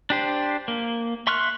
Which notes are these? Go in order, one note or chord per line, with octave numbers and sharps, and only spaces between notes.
D4 G4 C5
A#3
E5 C6 C#6 F6 F#6